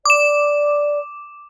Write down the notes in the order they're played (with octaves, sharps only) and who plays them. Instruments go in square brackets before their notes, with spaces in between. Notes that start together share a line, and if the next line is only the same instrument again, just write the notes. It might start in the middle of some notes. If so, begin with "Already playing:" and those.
[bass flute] D5 [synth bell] D6 E7